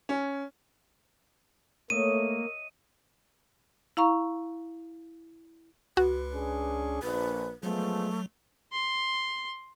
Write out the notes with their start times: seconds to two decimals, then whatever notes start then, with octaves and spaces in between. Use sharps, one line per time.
0.09 C#4
1.90 A3 A#3 C#5 D#5 E5 D#7
3.97 E4 F5 A#5 C#6
5.97 C#2 F#4 B4
6.32 C#4 D4 G#4
7.02 A#1 B4
7.63 F3 F#3 G#3 A3 B3
8.72 C6